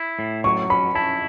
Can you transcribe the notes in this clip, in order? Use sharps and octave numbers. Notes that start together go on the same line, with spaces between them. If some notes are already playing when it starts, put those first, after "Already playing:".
Already playing: E4
A2
F#3 C#6
C#4 B5
E4 A5